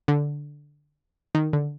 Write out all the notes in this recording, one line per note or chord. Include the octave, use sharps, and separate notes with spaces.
D3
D#3
D3